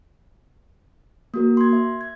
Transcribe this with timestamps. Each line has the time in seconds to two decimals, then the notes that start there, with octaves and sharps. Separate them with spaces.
1.34 A#3 F#4 A#4
1.57 C6 G#6
1.73 E5
2.01 G#6